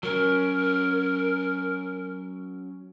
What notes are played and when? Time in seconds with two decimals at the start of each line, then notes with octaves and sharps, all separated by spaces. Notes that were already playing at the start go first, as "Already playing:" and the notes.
0.03 F#3 C#4 A#4